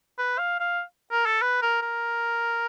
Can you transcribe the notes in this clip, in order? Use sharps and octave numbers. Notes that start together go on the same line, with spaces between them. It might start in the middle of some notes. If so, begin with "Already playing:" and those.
B4
F5
F5
A#4
A4
B4
A#4
A#4